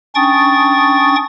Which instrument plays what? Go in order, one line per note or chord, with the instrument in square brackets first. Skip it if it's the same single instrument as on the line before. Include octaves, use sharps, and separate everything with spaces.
[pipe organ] C#4 D4 G5 C#6 D#6 A6